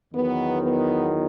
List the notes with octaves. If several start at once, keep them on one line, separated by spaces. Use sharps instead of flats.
E2 D#3 F#3 B3
B3